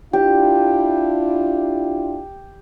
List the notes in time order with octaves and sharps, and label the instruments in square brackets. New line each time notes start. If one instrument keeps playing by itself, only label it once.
[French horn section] D4 E4 F4 [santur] G4